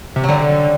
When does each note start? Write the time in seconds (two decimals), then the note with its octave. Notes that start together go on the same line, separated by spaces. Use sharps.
0.16 C3
0.24 D3 F#3 G3